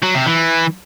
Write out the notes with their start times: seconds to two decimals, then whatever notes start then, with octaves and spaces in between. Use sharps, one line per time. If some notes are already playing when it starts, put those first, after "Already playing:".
0.03 F#3
0.15 C3
0.26 E3